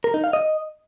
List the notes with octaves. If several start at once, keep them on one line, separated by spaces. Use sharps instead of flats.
A#4
D#4
F5
D#5